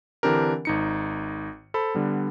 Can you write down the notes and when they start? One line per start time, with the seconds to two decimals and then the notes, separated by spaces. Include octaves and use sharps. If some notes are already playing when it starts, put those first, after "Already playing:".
0.23 D3 E3 C4 D4 G4 A#4
0.65 G#1 D#4 C#7
1.74 A4 C5 B5
1.95 D3 G3 B3